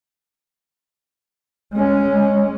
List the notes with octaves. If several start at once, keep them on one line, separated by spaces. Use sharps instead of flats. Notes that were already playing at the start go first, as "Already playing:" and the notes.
G#3 C#4